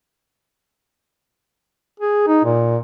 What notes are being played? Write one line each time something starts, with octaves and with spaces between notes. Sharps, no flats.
G#4
D#4
A#2